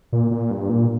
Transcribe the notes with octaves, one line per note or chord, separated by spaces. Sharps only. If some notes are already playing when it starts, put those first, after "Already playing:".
A#2
A#2
G2
A#2